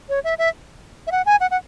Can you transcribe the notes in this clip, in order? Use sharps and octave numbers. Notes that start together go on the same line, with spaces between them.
C#5
E5
E5
E5
F#5
G#5
F#5
F#5